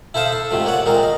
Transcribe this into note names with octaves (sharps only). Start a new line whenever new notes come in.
E4 A4 C5 F5 A5 D#6
A4
G#2 C3 F3 A3
A#3 C#5 D5 F#5
A#2 G#3 A#3 C4 A#4
D#5